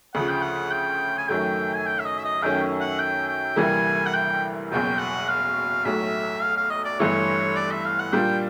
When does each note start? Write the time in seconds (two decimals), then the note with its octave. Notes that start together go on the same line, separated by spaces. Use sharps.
0.15 D2 C#3 F3 F#5
0.29 G5
0.42 F#5
0.71 G5
1.18 G#5
1.28 F#2 D#3 F#3 A3 G5
1.75 G#5
1.86 G5
1.99 E5
2.05 D#5
2.18 E5
2.24 D#5
2.42 F#2 D#3 F#3 A3 C#4 G5
2.80 F#5
3.00 G5
3.28 G5
3.56 D2 C3 E3 G3 A#3 G#5
4.06 F#5
4.14 G5
4.71 F#1 E2 B2 F#3 G5
4.99 F#5
5.28 F5
5.84 B1 A2 F#3 A3 E5
6.42 F5
6.57 F5
6.70 D#5
6.85 D5
6.99 G1 G2 E3 A3 C#5
7.56 D5
7.71 E5
7.85 F5
7.99 F#5
8.12 A#2 G3 A#3 D4 F4 G5